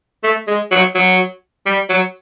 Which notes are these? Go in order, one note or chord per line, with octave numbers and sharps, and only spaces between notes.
A3
G#3
F#3
F#3
G3
F#3